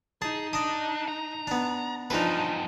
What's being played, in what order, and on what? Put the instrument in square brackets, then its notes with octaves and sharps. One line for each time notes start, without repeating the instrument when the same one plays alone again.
[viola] D#4 [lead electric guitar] G#4 [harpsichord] A5
[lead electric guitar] D4 [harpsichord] D#5 D#6
[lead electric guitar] A#5
[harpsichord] B3 D4
[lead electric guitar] E2 G2 [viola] F3 D#4 [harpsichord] D4 B4